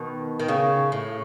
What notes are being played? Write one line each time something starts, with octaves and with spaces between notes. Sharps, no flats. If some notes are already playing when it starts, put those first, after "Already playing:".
Already playing: B2 D#3
D#3
C#3
A2